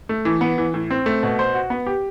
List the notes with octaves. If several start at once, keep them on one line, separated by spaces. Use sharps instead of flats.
A3
E3
B3
E3
A2
C4
A3
B2
C5
F#4
B3
G4